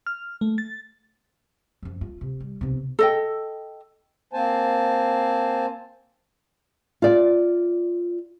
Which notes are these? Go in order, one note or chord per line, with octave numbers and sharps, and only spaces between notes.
F6
A3
A6
F#2 F3
F4
C3
G3
B1 C3
A4 D#5 G5
A#3 C4 C5 G#5 A5
F4 D5